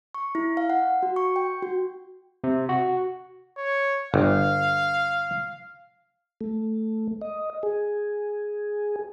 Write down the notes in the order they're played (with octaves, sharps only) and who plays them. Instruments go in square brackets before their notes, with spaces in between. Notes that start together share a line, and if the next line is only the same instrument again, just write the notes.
[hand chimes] C#6
E4
F5
F#5
F#4
C#6
G5
F#4
[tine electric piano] C3
F#4
[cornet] C#5
[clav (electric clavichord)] G1 [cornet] F5
[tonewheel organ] A3
D#5
G#4